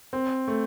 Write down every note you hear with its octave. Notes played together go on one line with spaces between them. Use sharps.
C4
A3